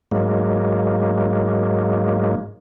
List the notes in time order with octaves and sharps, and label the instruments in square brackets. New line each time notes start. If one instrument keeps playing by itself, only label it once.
[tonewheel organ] G#2 F#3 G#3 A#3